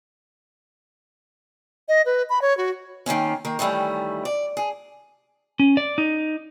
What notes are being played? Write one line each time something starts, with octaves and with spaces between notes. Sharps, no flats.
D#5
B4
B5
C#5
F#4
D#3 A#3 C4 C#4
D#3 A#3 A#4
D#3 E3 G3 A3 C#4
D5
G#4
C#4
D5
D#4